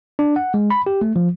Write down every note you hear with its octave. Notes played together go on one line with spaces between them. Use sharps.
D4
F#5
G#3
B5
G4
A3
F3